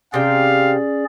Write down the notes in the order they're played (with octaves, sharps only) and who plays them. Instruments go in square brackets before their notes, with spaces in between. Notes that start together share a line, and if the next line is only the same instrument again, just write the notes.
[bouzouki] C3 G5 [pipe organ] C#4 G#4 D5 [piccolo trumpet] F5